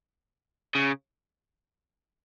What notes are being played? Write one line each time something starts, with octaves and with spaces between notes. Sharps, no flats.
C#3